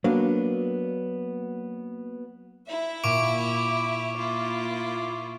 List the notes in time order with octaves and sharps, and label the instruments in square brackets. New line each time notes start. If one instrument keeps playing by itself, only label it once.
[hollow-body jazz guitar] F#3 A#3 B3 D4
[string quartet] E4 E5
[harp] A#2 [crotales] C#6 D6 D7
[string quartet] A#3 E4 F4